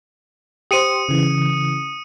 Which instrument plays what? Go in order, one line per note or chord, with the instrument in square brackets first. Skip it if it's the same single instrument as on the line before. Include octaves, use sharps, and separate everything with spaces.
[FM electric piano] G4 C5 [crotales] D#6 C#7 D#7
[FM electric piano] C#3 E3